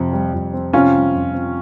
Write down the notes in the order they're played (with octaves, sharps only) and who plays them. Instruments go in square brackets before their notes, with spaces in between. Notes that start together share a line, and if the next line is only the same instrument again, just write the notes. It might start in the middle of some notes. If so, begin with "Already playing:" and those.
Already playing: [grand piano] F2 C3 C4
G3
F2
C4
[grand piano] C3 [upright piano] C#4 F4
[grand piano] G3
F2
C4